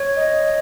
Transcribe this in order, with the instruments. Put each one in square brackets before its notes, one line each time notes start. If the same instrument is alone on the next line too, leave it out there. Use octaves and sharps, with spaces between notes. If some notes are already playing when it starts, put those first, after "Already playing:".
Already playing: [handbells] C#5
[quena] D#5